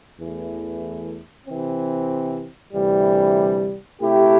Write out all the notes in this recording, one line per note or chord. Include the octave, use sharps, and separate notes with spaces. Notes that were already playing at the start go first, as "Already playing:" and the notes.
E2 E3 A3
C3 E3 C4
D2 C3 E3 G3
C3 A3 E4 G4